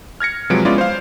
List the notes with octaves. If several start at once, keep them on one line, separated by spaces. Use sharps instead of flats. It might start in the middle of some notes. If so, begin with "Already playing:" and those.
F6 G#6 A#6 C#7
C3 F3 F#3 G#3 B4 D7
G#3 B3 C#4 E4 F4 D5
C5 F5